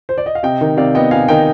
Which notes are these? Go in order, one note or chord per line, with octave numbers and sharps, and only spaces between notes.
C5
D5
D#5
F5
C3 D#5 G5
D#3
C3 D5 F5
B3 D#5 G5
C3 F5 G#5
D#3 D#5 G5